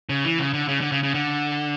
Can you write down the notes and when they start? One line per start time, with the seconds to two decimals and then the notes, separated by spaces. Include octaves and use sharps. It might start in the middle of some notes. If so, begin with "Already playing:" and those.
0.09 C#3
0.24 E3
0.39 C#3
0.54 D3
0.68 C#3
0.81 D3
0.92 C#3
1.03 C#3
1.14 D3